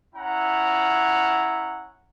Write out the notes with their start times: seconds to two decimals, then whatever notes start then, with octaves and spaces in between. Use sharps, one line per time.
0.15 C#4 E4 F#5 A#5